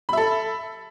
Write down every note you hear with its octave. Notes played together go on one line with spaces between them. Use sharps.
A4 E5 B5